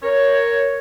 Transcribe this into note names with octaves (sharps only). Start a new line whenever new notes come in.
A#4 C#5